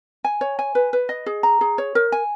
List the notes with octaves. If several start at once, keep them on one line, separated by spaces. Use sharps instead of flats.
G#5
C#5
G#5
B4
B4
D#5
G#4
A#5
G#4
C#5
A#4
G#5